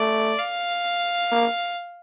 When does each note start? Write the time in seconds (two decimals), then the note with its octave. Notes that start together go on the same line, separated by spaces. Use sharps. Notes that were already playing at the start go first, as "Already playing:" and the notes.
Already playing: A3 D5
0.39 F5
1.32 A#3